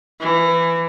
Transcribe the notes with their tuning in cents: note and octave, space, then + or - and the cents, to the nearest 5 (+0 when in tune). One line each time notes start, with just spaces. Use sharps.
E3 +20